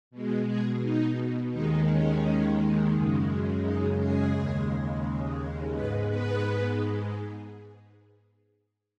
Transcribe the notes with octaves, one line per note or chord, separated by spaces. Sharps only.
B2 G#3
G#3 G#4
D#4
D#2 D#3 G#3 D#4
C#4
F#2 C#3 G#3
D#4
G#3 G#4
D#2 C#3 G#3
G#2 G#3 B3 B4
B3 B4